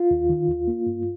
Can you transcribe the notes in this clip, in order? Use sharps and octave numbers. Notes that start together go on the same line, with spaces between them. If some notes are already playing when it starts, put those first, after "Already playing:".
Already playing: F4
D#2
D#3
D#2
A#3
G2